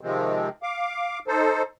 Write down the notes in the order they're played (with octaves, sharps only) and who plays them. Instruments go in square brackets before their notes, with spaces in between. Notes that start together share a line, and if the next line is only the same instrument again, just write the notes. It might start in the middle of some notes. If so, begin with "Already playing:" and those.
[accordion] C3 D#3 F3 G#3 C4
F5 D6
D#4 A4 C5